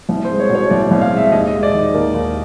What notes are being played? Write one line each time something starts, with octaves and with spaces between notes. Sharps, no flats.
C2
G#3 C5
C#5
B2
C#5
C2 D5
C2
F5
G#3
E5
D#2 D#5
D#5
G#3
D5
D#3
D#2 A#4
D#2